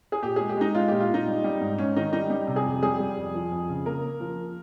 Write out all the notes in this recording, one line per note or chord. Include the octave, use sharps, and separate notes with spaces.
G#4
A#2 G4
G#3 G#4
G4
G#3 D#4
G#3 F4
A#2 G4
F4
A#2 D#4
G3
G3
G#2
G#2 C#4
D#3 D#4
G3 D#4
G3
C3
G#4
F2
G3 G#4
G3
F2
F3
F2
C#3
A#3 A#4
A#3
F3